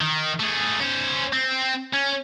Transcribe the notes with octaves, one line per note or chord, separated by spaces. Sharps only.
D#3
A3 G#4
C#4 C5
C4
C#4